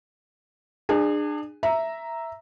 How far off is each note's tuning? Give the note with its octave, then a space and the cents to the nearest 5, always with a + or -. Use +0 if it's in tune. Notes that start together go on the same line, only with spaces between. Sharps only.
D4 +30 G#4 -15
E5 +0 A#5 +0